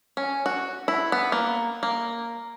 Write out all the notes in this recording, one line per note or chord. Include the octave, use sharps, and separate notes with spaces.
C#4
F#4
E4
B3
A#3
A#3